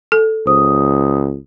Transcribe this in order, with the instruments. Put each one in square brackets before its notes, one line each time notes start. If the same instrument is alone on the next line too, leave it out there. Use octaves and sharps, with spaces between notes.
[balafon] A4
[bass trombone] C#2 [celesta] C5 D#6